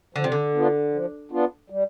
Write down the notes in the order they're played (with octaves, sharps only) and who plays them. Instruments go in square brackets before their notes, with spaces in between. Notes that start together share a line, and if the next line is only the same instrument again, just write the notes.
[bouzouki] D3 [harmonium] F3
[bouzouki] C3
D3
[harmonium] B3 D4 F4
F3
B3 D4 F4
G3